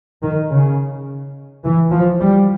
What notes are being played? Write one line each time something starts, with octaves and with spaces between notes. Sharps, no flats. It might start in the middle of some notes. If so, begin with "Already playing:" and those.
D#3
C#3
E3
F3
G3